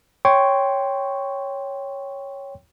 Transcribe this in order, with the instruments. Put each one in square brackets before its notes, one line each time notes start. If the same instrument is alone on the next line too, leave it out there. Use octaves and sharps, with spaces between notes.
[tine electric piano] C#5 G5 C6 C#6